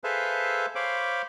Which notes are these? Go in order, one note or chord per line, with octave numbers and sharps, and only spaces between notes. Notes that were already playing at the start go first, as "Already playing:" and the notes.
G#4 A4 B4 C5 E5 F5
C5 C#5 F5 B5 D6